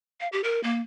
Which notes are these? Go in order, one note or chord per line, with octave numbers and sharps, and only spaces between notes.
F5
G4
A#4
A#3